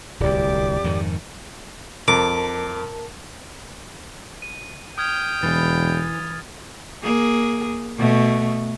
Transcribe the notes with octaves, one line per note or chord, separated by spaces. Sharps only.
D1 C2 G4 D5 D6
F2 G#2 D#3
F2 A#4 A5 D6
D#7
G5 D#6 F6 G#6
E1 E3 A6
A#3 G#4
B2 A3